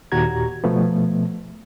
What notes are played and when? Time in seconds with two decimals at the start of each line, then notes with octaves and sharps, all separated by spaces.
0.12 D#2 A#2 F#4 G4 A#5 G#6
0.64 B2 F3 A3 B3